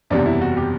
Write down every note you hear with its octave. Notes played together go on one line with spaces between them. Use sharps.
F#1 E2 C3 G3 D4
E4
F#4
G4